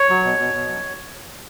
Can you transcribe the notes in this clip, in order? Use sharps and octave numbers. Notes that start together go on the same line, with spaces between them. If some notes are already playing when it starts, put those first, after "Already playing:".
Already playing: C#5
F#3
B2
B2
B2
F#3